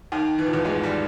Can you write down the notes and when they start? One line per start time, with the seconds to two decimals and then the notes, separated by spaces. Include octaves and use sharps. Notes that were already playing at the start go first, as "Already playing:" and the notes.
0.12 D#2 D#3
0.38 E3
0.46 F3
0.53 E2 E3
0.65 G#2 G#3
0.83 G3